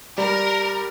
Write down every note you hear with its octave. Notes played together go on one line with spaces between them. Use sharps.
G3 A#4